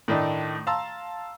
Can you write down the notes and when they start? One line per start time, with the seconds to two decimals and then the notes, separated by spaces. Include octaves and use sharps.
0.08 A2 D#3 A3 D4 D#4
0.67 F5 A5 A#5 C6 E6